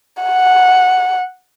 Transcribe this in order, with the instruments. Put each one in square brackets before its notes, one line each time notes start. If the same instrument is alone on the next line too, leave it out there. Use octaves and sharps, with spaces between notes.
[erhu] F#5